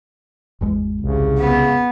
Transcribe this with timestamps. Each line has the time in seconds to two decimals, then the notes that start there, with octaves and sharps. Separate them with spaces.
0.61 G#1 E2 G#3
1.01 C2 C#3
1.38 B3